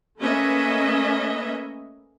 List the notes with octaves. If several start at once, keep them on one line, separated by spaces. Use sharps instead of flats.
A3 A#3 C#4 B4 D#5 E5